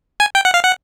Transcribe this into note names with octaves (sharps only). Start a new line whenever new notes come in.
G#5
G5
F#5
F5
F#5